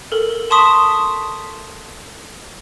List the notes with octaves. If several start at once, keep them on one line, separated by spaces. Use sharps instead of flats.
A4 A#4
A5 C6 C#6 D#6 B6 E7